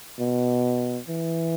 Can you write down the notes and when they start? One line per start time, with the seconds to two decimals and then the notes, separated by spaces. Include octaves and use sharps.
0.20 B2
1.08 E3